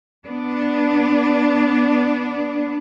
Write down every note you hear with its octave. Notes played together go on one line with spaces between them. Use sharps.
B3 D4